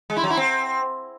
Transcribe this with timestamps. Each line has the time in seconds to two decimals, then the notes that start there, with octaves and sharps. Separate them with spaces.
0.10 G#3
0.17 E4
0.24 F#3
0.30 E4
0.37 C4